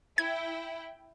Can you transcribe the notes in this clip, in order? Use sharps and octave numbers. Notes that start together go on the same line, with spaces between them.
E4 G5 G#6